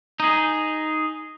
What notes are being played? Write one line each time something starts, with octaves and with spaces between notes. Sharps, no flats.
D#4 G#4